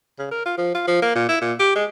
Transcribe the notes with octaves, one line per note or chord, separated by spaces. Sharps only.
C#3
A#4
F4
F3
F4
F3
A#3
A#2
E4
A#2
G4
G#3